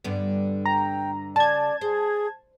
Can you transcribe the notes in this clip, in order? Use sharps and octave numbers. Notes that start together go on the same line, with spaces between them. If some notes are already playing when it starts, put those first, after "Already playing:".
G2 D3 B3
G5 A#5
C#3 D5 A5 G#6
G#4 C5